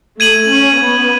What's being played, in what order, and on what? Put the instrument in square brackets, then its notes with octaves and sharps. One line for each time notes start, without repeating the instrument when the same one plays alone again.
[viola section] A3 [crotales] G#6 D#7 F#7
[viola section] C#4
B3